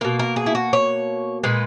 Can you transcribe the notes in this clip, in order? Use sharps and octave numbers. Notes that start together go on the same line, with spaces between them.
B2 A#3 A#4
A#4
G#4
E4
F#4
C#5
A#2 G#3 B4